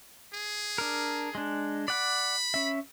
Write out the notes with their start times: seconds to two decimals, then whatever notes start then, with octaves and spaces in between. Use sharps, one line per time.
0.34 G#4
0.78 D4 A#4
1.35 G#3 D4
1.88 D5 F#5 B5 D6
2.54 C#4 E5